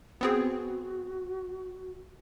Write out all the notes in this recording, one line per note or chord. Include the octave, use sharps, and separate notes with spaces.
B3 C4 F#4 G#4